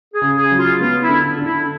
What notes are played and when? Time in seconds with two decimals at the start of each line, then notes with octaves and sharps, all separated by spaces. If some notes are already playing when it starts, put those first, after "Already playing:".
0.14 G#4
0.22 C#3
0.37 G#4
0.51 F#3
0.58 F4
0.80 B3 F4
1.02 E4
1.09 D3
1.39 D3
1.45 E4